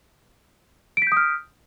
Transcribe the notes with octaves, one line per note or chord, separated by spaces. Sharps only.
D#6 F6 G6 B6 D7